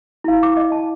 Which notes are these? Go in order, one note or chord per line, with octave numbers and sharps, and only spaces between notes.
E4 F5
D6
D#5
A5